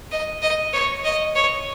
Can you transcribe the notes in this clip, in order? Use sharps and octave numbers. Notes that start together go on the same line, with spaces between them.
D#5
D#5
C#5
D#5
C#5